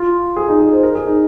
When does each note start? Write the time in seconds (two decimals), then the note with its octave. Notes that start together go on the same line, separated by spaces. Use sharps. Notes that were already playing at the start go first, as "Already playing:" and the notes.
Already playing: F4
0.36 G#4
0.48 D#4
0.60 G#4
0.73 C5
0.83 A#4
0.95 G#4
1.07 D#4